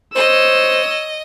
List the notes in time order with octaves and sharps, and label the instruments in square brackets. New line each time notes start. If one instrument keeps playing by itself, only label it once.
[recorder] C5 [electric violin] C#5 E6 [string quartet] D#5